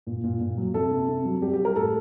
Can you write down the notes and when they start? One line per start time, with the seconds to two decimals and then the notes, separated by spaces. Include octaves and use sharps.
0.07 A#2
0.24 A#2
0.41 A#2
0.57 F#3
0.74 C3 A4
0.91 C3
1.08 C3
1.25 F#3
1.42 G3 G4
1.53 G4
1.59 G3
1.65 A#4
1.76 A2 A4